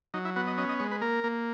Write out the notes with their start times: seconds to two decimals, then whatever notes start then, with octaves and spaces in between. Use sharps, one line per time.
0.14 F#3 D#4
0.25 E4
0.36 B3 F#4
0.47 D#5
0.58 C#4 D#5
0.69 D#5
0.79 G#3 C#5
0.91 B4
1.01 A#3 A#4
1.24 A#3